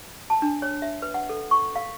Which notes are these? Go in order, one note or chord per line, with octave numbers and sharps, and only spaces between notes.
A5
D4
C#5
E5
B4
F#5
A4
C#6
F5